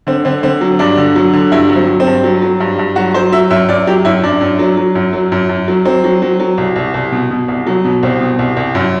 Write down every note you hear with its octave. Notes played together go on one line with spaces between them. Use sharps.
D3 C4
D3 C4
D3 C4
F#3
G2 D4
D3
F#3
D3
G2 E4
F#3
C4
F#3
C4
G2
F#3
F#3
G2
G2
F#3 F#4
F#3 C5
F#3 E5
F#2 E5
F#2 D5
F#3 G4
F#2 E4
F#2 D4
F#2
F#3
F#3
F#2
F#3
F#2
F#2
F#3
F#3 C4
F#3
F#3
F#3
C2
C2
C2
B2
B2
C2
F#3
B2
C2 C4
B2
C2
C2
F#2